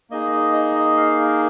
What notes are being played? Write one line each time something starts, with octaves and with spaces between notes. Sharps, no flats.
A#3 D#4 G#4 D#5
D#5
D#5
D#5
F5
A#4